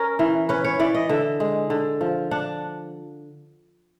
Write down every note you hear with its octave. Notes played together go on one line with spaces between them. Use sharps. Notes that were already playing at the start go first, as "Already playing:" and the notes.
Already playing: C#4 A#4
E3
C#4 B4
C#5
E3 D5
D#5
D3 E5
G#3
D3
F3
D4 F#5